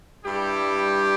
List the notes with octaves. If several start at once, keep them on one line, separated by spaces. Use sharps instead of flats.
G2 G3 E4 G4